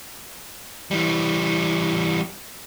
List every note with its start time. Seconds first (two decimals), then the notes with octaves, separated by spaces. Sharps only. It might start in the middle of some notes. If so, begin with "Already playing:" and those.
0.91 E3 G3